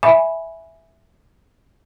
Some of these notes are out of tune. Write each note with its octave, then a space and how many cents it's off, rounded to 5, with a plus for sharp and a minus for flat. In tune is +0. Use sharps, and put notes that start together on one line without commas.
E5 +0 G#5 +0 B5 -5